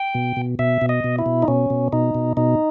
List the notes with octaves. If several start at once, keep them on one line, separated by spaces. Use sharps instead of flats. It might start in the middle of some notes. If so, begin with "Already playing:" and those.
Already playing: G5
B2
B2
B2 E5
B2
D#5
B2
E4
B2
D#4
B2 C#4
B2
B2 D#4
B2
B2 D#4